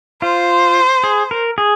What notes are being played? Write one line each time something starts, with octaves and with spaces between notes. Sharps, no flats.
F4 C5
G#4
A#4
G#4